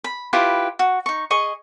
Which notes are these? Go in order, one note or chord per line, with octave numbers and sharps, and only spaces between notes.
B5
E4 F4 G4 B4
F#4
D#4 C#6
G#4 D#5 C#6